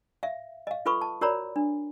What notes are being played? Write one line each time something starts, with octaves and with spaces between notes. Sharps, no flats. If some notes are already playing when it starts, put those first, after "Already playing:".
E5 F5
D#5 F5
F4 A4 B4 B5 C#6 D#6
A5
F#4 A#4 C#5 D5 A#5 B5
D4